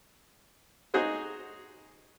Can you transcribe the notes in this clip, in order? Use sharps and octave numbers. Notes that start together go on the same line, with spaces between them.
D#4 F#4 G#4 C5